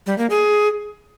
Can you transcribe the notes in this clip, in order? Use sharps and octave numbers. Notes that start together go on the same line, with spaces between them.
G3
A#3
G#4